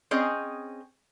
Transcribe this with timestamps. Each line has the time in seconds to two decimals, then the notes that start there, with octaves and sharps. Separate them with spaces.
0.11 C4 C#4 G#4 D#5